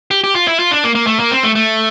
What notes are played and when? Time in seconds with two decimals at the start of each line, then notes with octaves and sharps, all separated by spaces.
0.11 G4
0.24 G4
0.35 F4
0.48 E4
0.59 F4
0.71 D4
0.84 A#3
0.95 A#3
1.07 A3
1.19 A#3
1.31 C4
1.43 A3
1.55 A3